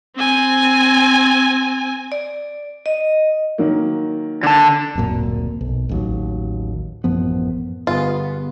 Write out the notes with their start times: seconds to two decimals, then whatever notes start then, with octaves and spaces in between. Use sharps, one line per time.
0.17 C4 G#5
2.12 D5
2.86 D#5
3.58 D#3 F#3 A#3
4.43 D3 A5
4.95 D1 G#1 F#2 A#2
5.61 B1
5.89 A1 D#2 F#3
7.04 A1 F#2 F3 B3
7.87 G1 B3 F4 G#4